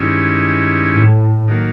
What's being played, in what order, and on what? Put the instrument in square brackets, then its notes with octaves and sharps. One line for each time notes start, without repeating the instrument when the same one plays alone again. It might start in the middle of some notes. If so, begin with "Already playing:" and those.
Already playing: [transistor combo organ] G2 D#3 G#3 C#4 E4
[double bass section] A2
[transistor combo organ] D#3 F#3 A#3